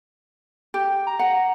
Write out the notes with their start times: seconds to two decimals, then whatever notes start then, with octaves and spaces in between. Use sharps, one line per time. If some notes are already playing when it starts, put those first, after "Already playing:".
0.74 G4
1.07 A#5
1.19 F#5